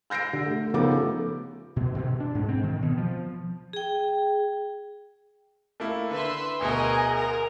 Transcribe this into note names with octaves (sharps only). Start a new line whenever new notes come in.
E6 G6 A#6 C7 D7
D3
A3
C#3 F3 B3 D#4 A4 D6
A3
B2
B2
D4
G#2
C4
D#3
B2
F3
G#4 G5
A3 A#3 E4
D3 B4 E5 C6
D2 B2 G#4 A#4 D#5
A#4